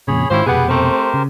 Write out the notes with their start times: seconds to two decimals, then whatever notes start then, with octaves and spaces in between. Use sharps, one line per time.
0.08 F2 A#2 C#3 G#4 C#5 B5
0.31 G#2 D#3 C#4 E4 F4 G4 C5
0.47 F1 B2 B3 G4 G#4 B4
0.69 A3 C4 G4 A#4 C5
1.14 C#3